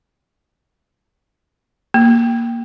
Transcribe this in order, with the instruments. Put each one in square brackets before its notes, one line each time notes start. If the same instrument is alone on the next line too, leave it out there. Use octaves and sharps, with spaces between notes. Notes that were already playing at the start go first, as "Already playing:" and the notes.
[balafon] A#3